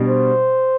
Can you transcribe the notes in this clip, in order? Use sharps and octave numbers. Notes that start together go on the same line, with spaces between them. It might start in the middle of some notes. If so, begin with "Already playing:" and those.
Already playing: B2 G3 D4
C5